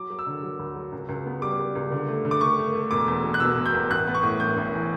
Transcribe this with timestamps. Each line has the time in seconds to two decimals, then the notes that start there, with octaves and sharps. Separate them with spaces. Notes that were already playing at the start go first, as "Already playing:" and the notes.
Already playing: F#3 D6
0.10 F#3
0.19 E6
0.27 D3
0.43 F#3
0.59 D2
0.76 F#3
0.92 C#2
1.09 C#2
1.26 B3
1.42 G3 D6
1.59 G3
1.76 C#2
1.92 D3
2.08 A3
2.25 D3
2.31 D6
2.41 A3 C#6
2.59 A3
2.75 A3
2.91 E1 D6
3.08 E2
3.24 B2
3.34 F#6
3.40 B2 E6
3.58 E1
3.66 G6
3.74 E2
3.90 A1 F#6
4.07 B3
4.14 C#6
4.23 A2
4.40 A1 G6
4.57 A1
4.74 E3